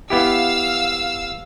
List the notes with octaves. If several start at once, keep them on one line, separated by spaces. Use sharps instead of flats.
B3 E4 G4 F5 E6